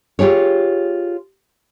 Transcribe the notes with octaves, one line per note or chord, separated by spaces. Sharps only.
F4 G4 G#4 C#5